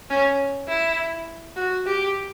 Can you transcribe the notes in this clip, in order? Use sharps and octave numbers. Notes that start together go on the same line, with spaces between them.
C#4
E4
F#4
G4